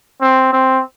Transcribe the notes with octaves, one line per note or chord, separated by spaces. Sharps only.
C4
C4